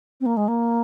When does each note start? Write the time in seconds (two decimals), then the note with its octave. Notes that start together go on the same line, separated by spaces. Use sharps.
0.21 C4
0.26 A#3
0.37 G#3
0.48 A#3